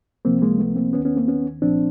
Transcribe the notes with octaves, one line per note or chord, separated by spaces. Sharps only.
C#2 C3 F3 A#3 C4
G#3 A#3
A3 B3
A#3 C4
D#2 D#3 B3 C#4
B3 C#4
A#3 C4
B3 C#4
C2 A#2 F3 C4 D4